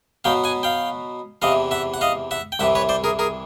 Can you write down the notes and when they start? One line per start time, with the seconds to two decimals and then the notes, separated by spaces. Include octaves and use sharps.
0.24 B2 F#3 B3 F5 G5
0.44 F#5 G#5
0.63 F5 G5
1.42 E2 C3 E3 D#5 F5
1.71 E5 F#5
1.94 F#5
2.01 D#5 F5
2.31 E5 F#5
2.52 G5
2.59 C2 C3 E3 E5 F#5
2.75 B4 C#5
2.89 C5 D5
3.04 G#4 A#4
3.19 G#4 A#4